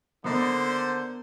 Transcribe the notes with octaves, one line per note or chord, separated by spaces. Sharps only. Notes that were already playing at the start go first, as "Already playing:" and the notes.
D3 B3 A#4 C5 D5